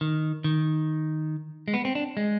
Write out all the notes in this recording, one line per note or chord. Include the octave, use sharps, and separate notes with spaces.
D#3
D#3
G#3
B3
C4
D4
G#3